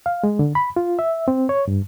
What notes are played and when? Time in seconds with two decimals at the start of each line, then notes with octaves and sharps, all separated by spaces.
0.06 F5
0.24 G#3
0.39 D3
0.55 B5
0.76 F4
0.99 E5
1.28 C4
1.49 C#5
1.68 G2